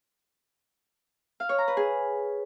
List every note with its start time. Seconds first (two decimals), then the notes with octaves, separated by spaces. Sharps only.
1.40 F5
1.49 C#5
1.58 A#5
1.68 B4
1.77 G#4